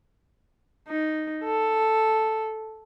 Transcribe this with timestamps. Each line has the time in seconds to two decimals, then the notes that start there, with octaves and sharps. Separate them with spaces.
0.88 D#4
1.45 A4